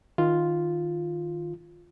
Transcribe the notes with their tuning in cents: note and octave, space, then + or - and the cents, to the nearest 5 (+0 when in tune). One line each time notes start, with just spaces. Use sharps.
D#3 +0 F4 +0